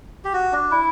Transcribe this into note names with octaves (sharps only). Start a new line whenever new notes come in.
G4
F#4
D4
E4